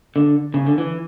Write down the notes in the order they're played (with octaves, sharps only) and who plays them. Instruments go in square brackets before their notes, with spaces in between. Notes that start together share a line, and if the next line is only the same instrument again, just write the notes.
[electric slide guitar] D3
C#3
D3
E3